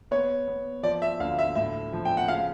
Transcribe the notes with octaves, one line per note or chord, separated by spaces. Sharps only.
B3 C#5
B3
F3 D5
E5
D2 F5
E5
A2 E5
F3
G5
F#5
C#3 F5